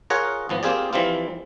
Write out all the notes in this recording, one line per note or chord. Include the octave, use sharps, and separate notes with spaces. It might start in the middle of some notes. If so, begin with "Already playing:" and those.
F4 G#4 A#4 C#5 F#5
G#1 F3 B3
A#3 C4 F4 G4 G#4 D5
E3 F3 G3 C4 F4